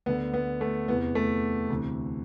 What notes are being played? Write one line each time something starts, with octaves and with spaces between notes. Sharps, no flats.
D2 D3 B3
B3
A3
E2 C3 E3 B3
A3
D2 C3 E3